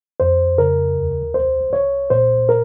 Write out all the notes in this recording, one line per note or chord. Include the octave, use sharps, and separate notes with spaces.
F2 C5
C#3 A#4
D#2
C2 C5
C2 C#5
A#2 C5
A#4